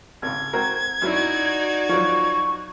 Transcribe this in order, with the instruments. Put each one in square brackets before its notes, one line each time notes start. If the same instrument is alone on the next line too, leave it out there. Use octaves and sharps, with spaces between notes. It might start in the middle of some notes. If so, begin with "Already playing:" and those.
[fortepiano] G#1 C#3 [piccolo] G#6
[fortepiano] C4 F#4 A#4
[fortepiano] F#2 F#3 E4 [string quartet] D#4 F#4 D5
[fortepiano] F3 F#3 [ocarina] C#6